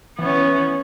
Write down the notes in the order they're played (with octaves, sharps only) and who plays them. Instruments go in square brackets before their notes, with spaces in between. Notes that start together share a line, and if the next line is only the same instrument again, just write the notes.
[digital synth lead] E3 [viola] B3 C#4